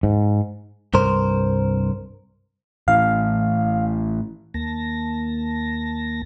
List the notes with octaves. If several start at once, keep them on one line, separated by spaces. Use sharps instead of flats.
G#2
C2 G2 A#4 C5
A2 E3 F5
D#2 A#3 A5 A#6